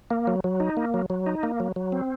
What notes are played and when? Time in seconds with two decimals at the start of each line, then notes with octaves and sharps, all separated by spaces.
0.10 A#3
0.27 F#3
0.44 F#3
0.60 D#4
0.77 A#3
0.94 F#3
1.10 F#3
1.26 D#4
1.43 A#3
1.60 F#3
1.76 F#3
1.92 C4